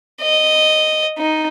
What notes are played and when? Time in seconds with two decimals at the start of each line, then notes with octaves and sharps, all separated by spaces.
0.21 D#5
1.18 D#4